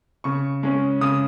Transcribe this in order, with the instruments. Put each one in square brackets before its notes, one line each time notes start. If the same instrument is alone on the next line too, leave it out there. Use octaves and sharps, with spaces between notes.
[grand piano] C#3 C#6
G#3 C#4
C#3 D#6